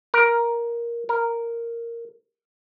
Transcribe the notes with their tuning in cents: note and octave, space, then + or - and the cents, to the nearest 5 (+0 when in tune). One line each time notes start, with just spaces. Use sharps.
A#4 +10
A#4 -5